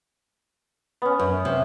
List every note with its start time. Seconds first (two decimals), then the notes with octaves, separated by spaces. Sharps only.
1.02 B3 C#4
1.20 F#2
1.45 C3